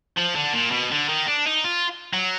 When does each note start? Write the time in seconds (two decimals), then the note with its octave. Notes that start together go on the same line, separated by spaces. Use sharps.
0.18 F3
0.36 D3
0.54 A#2
0.72 B2
0.92 D3
1.09 D#3
1.27 D4
1.46 D#4
1.64 F4
2.13 F#3